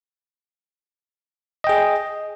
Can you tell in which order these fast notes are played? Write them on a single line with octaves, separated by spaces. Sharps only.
D#5 G5 G#4